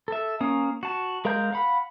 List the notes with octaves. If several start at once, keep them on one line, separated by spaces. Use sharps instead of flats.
A4 E5
A#3 C#4 D#6
F#4 A5
G#3 A#4 F5 A#5 G6
F5 F#5 B5